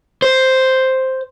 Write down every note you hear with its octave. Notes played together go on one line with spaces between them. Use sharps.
C5